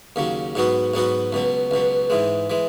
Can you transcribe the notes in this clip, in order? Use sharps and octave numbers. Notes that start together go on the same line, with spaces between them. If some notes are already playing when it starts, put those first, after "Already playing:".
D#2 C#3 F#3
G#2 F#3 B3 F#4
G#2 F#3 B3 F#4
C#2 B2 F#3
C#2 B2 F#3
G#2 E3 G#3
E3 G#3